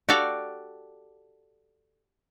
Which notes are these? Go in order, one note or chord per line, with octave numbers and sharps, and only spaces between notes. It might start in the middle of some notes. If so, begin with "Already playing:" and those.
F#4 G4 A4 D5 F5 G5